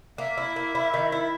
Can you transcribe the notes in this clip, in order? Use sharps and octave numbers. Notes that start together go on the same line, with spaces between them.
A#3 E5
E4
A#3
E4
D#3
E4